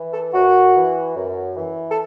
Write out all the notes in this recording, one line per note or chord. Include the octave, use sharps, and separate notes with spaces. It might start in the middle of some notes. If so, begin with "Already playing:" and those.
Already playing: E3
A4
F#2 F#4
E3
F#2
E3
A4